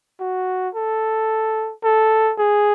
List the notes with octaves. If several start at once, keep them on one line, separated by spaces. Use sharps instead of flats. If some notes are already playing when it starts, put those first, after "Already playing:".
F#4
A4
A4
G#4